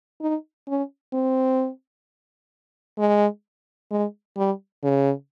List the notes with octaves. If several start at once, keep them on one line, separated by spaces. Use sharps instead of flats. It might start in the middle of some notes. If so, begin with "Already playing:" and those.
D#4
C#4
C4
G#3
G#3
G3
C#3